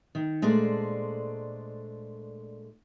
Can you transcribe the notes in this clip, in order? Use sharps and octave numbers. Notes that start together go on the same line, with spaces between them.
D#3
A#2 G#3 A3 D4 C5 D5